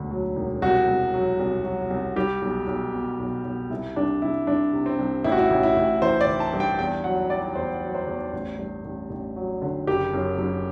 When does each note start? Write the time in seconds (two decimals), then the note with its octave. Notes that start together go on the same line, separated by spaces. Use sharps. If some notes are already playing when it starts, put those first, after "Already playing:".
Already playing: E1 D2 D3
0.11 F#3
0.36 E1
0.62 C2 F#4
0.87 C2
1.14 F#3
1.39 C2
1.65 F#3
1.90 C2
2.16 G3 G4
2.42 B1
2.67 B1
2.94 B2
3.19 B1
3.45 B1
3.70 C2 E4
3.96 C2 D4
4.22 C2 E4
4.47 C2 D4
4.73 C3
4.86 C4
4.99 C2
5.24 A1 E4
5.32 F#4
5.39 E4
5.50 A1
5.63 E4
5.76 A1
6.02 E3 C5
6.21 D5
6.27 E3
6.40 A5
6.54 G2
6.60 G5
6.79 E2 G5
7.04 F#3 F#5
7.30 F#3 D5
7.56 E2 C5
7.82 F#3
7.95 C5
8.07 E2
8.33 A1
8.59 G2
8.84 A1
9.10 A1
9.36 F#3
9.62 D3
9.87 F#1 G4
10.13 F#2
10.38 F#2